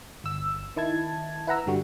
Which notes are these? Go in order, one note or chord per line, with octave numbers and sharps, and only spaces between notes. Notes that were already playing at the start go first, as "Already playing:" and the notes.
G1 E6
D#3 E4 A5 G#6
E4 B4 F#5 A#5 E6
G2 D3 G3 F#4